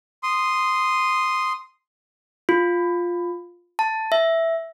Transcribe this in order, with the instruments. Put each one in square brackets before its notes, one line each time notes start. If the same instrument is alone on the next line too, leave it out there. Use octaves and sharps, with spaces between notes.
[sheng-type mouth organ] C6 D#6
[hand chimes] F4
A5
E5